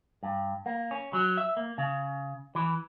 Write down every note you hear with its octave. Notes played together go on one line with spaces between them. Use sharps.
G2
A#3
C#4
F#3
E5
A#3
C#3
E3